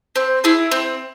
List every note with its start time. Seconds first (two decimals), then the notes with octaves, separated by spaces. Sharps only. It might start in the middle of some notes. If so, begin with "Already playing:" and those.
0.16 C4
0.44 E4 G#4
0.71 C4